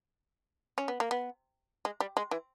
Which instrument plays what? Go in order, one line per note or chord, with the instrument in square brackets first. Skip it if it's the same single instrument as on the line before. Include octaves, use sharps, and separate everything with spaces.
[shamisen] C#4
B3
A#3
B3
G#3
G3
G#3
E3